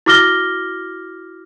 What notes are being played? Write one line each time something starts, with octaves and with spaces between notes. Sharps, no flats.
E4 F#4 D6 F6 A#6 G7